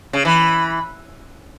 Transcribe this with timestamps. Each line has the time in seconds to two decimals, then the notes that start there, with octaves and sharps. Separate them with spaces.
0.13 C#3
0.25 E3 B5